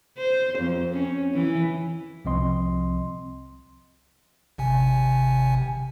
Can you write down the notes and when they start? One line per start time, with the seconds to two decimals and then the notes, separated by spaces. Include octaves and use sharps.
0.18 C5
0.59 F2
0.93 C#4
1.33 E3
2.25 C2 F3 C4 D#5 C6
4.58 G#1 C3 G#5